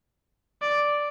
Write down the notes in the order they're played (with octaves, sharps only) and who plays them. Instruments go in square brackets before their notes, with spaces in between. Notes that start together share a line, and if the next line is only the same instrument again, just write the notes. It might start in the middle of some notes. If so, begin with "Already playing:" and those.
[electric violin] D5